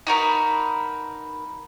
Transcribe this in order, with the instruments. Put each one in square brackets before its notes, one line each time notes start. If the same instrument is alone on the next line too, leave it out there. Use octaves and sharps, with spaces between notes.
[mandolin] D#4 F#4 A#4 B4